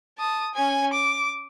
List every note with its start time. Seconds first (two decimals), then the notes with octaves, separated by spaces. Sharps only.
0.18 A5 D#6
0.54 C#4 G#5
0.93 D6